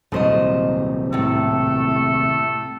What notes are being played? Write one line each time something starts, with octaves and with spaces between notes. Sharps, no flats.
D#1 C2 F#3 A3 C5 D#5
A2 C3 A3 A4